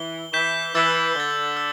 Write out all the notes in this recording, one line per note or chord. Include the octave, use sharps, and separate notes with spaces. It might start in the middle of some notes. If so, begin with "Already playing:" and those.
Already playing: E3 G7
E3 G6 B6 E7 G7
E3 E6 A6 E7 G7
D3 A6 G7
E6